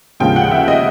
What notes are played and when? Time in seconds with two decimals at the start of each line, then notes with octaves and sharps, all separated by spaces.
0.20 D#2 C#3 F3 G#3 G5
0.36 F#5
0.51 E5
0.68 D#5